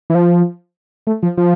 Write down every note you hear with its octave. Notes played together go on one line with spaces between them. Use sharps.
E3
F3
A3
F3
F3